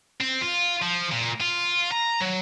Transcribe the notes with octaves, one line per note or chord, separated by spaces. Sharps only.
C4
F4
F3
A#2
F4
A#5
F#3